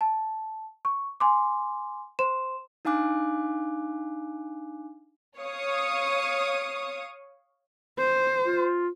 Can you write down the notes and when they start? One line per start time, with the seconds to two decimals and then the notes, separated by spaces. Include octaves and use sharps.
0.01 A5
0.85 C#6
1.20 G#5 C6 D6
2.19 C5 C6 E7
2.85 D4 D#4 F5 G#5 D6 F#6
5.39 C#5 F5 C#6 D#6
7.98 C5
8.45 F4